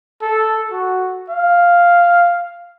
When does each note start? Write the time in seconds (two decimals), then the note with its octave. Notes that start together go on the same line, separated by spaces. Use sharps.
0.22 A4
0.71 F#4
1.29 F5